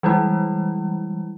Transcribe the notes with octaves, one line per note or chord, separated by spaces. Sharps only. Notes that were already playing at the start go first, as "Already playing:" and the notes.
E3 G3 G#3 E4